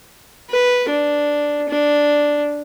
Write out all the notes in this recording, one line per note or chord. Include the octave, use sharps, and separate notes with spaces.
B4
D4
D4